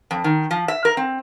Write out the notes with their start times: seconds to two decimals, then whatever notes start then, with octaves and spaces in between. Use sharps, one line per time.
0.11 F2
0.24 D#3
0.51 F3
0.68 E5
0.85 A#4
0.97 C4